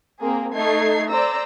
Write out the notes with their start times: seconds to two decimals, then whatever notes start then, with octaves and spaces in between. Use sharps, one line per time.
0.20 A#3 C4 G#4 A#4
0.55 A3 D#4 A4 G#6 C7
1.09 C5 D5 A#5 E6